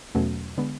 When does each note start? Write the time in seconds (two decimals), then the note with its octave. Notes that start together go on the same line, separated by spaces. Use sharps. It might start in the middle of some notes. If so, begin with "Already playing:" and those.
0.15 E2 B2 F#3 A3 C#4
0.58 D3 G#3 B3